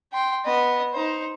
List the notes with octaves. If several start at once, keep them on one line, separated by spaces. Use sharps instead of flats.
G5 C6
B3 D#5
D#4 C5